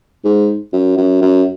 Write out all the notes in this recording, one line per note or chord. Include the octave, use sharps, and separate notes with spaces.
G#2
F#2
F#2
F#2